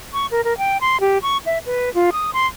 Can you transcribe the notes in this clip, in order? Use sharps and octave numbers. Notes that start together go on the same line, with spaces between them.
C#6
A#4
A#4
G5
C6
G4
C#6
E5
B4
F4
D#6
C6